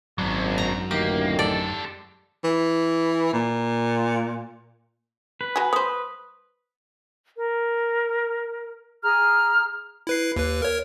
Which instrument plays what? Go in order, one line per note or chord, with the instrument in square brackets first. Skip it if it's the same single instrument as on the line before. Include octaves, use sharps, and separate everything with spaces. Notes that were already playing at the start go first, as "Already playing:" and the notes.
[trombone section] G#1 [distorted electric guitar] F#2 [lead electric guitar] F#3 D4
[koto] A#5
[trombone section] A1 D2 D#3 [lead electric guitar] A#3 [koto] G4
[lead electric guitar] G#3 A4 [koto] D5
[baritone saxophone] E3
A#2
[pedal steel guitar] B4
[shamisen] F#3 G#4
[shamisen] C5 C#5 [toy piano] D#6
[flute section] A#4
G#4 A#5 F6
[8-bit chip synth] E4 B4 C7
D#2 B4
A#4 C#5